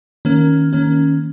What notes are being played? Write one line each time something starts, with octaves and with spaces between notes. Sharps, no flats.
D#3 A#3 C#4
D#3 A#3 C#4